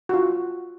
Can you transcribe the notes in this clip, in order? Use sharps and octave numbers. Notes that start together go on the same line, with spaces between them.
F#4
F4